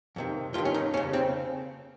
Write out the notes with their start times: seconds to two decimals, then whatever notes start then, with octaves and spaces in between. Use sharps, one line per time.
0.16 F2 C3 D#3
0.54 G2 D#3 F4
0.65 C#4
0.74 D#4
0.93 F2 C#4
0.97 C#3
1.13 C4